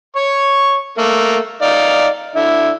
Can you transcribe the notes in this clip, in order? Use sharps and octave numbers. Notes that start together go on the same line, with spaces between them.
C#5 C#6
A3 A#3
D#4 D5 F5
D3 E4